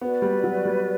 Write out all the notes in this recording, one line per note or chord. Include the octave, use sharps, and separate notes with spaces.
B3 F#4 B4 D5
G3
F#3
G3